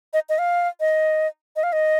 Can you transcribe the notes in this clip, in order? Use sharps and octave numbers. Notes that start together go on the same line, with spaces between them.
D#5
D#5
F5
D#5
D#5
F5
D#5